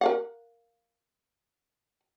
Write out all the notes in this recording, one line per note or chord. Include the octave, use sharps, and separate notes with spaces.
A#4 F5 F#5